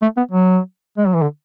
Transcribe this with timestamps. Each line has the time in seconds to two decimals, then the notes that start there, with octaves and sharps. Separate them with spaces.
0.02 A3
0.17 B3
0.31 F#3
0.98 G#3
1.07 F#3
1.15 E3
1.22 D3